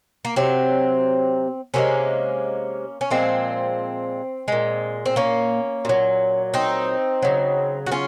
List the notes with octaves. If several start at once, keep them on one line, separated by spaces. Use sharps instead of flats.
A#3
C3 F#3 C4
C3 F3 G#3 A#3 C#4
C#4
A#2 F3 G#3 C4
A#2 G#3
C4
A#3 C#4
A#2 F#3
C4 D#4
C#3 F#3
F#4
C#4 F4